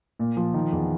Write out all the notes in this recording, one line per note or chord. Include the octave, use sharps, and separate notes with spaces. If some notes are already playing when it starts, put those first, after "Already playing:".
A#2
F3
D#3
E2